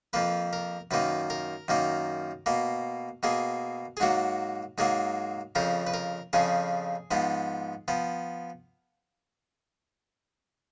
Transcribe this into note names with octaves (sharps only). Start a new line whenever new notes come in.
F2 F3 A#3 B4
A#4
F#2 D#3 A#3 B4
A#4
F#2 D#3 A#3
B2 A#3
B2 A#3 G#4
G#4
G#2 F#3 A#3 F#4
G#2 F#3 A#3 G#4
F2 C#3 F3 A#4
B4
A#4
F2 C#3 F3 G#4
G#2 F3 B3
F3 B3